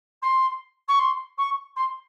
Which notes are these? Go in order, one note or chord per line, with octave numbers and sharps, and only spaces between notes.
C6
C#6
C6
C#6
C6